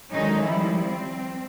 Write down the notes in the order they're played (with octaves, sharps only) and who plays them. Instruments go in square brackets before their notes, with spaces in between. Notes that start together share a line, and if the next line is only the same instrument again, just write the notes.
[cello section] D3 D#3 F#3 G#3 C#4 D#4
F3 G3 E4
C4